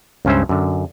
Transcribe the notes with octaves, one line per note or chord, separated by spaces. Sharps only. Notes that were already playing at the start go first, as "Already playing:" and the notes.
C#2 G2 C#4 C5 E5
F#2 D3